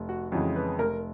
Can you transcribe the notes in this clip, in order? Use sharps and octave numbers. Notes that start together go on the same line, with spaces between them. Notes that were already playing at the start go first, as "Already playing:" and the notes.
Already playing: F1
F#4
F2 C#3 E3 G#3 F#4
B4
F1 A#4